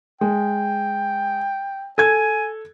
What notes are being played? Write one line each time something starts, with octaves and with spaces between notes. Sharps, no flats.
G#3 G5
A4 G#5 G#6